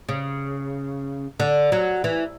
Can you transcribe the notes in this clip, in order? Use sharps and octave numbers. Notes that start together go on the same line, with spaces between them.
C#3
D3
F#3
E3